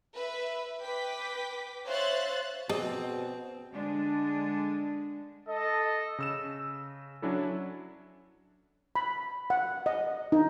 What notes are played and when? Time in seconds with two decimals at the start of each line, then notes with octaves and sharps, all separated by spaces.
0.14 B4 E5
0.83 B4 G5 D6 B6
1.86 C5 C#5 E5 F5 F#6 A6
2.69 B2 C4 G#4 D5 D#5
3.73 D3 G#3 D4
5.47 A4 D#5
6.19 C#3 E6 E7
7.22 F#3 C#4 D4 E4 A4
8.95 B5
9.50 F#5
9.86 D#5
10.32 D#4